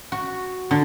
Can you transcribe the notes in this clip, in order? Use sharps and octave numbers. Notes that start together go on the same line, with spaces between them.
F#4
D3